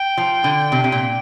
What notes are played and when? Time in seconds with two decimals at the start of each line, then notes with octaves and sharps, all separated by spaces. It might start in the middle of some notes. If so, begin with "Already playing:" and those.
Already playing: G5
0.17 F3
0.44 D3
0.72 C3
0.84 C3
0.92 A#2